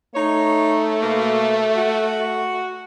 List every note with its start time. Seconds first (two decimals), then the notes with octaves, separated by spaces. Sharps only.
0.14 A3 D#4 C#5
1.01 B2 A#3
1.76 F#4